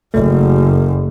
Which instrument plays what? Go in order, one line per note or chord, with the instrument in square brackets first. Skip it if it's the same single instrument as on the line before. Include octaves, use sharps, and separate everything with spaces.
[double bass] F#1 F#2 [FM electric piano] A3